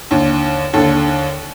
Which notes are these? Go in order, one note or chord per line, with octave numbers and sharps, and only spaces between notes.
D#2 D3
D#2 D3 A4